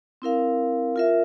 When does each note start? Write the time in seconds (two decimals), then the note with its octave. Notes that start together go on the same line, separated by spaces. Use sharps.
0.22 C4 E4 A#4 F5
0.96 F4 A#4 E5